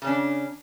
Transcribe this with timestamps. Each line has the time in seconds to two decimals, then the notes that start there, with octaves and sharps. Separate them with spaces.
0.02 C#3
0.04 C#4
0.07 D4